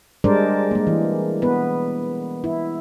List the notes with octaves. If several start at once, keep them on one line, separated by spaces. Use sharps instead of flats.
G3 G#3 D4 A#4 C5 D5
G#3 A#3
E3
B3 B4
E4